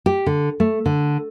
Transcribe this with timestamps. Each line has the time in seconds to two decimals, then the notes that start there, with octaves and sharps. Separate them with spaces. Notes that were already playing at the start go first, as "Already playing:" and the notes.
0.06 G4
0.26 D3
0.60 A3
0.86 D3